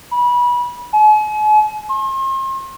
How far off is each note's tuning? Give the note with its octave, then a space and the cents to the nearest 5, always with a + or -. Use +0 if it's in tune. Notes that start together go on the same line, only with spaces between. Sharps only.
B5 -25
G#5 +45
C6 +40